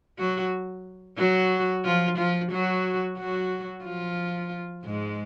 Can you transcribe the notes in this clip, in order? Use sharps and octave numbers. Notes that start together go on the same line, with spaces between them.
F#3 F#4
F#3 F#4
F3 F4
F3 F4
F#3 F#4
F#3 F#4
F3 F4
G#2 G#3